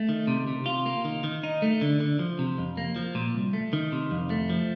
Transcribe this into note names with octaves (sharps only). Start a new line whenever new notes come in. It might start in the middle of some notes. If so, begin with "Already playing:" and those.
Already playing: A3
D#3
C3
C3
F4
A#3
D#3
D#3
D#4
A3
D3
D3
F3
C3
F2
A#3
F3
A#2
C2
A3
D#3
C3
F2
A3
F3